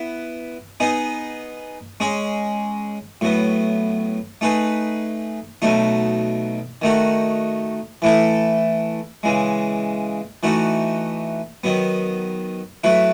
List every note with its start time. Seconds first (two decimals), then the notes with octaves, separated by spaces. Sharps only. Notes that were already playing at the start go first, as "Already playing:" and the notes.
Already playing: B3 E4 B4
0.80 B3 D#4 G#4 D#5
2.00 G#3 C#4 G#4 D#5
3.21 A2 F#3 B3
4.41 A3 D#4 G#4 B4
5.62 B2 F#3 A3 D#4
6.82 D#3 A3 D#4 F#4
8.02 E3 A3 E4 A4
9.23 C#3 E3 G#3
10.43 E3 A3 D#4 F#4
11.64 D#3 F#3 B3
12.84 F#3 A3 E4 B4